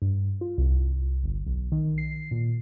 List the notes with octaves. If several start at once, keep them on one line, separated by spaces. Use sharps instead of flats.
G2
F4
C2
C2
G1
B1
D#3
C7
A#2